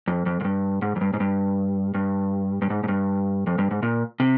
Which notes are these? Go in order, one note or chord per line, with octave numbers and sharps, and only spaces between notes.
F2
F2
F2
G2
G#2
F2
G2
G#2
G2
G2
G2
G#2
G#2
G2
F2
G2
G#2
A#2
C3